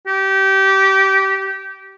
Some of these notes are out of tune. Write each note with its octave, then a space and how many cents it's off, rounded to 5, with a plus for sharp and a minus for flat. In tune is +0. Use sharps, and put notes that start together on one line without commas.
G4 -20